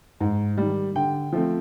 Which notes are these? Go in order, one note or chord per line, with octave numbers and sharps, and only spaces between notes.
G#2
D#3 G3
D3 G5
F3 A3 C4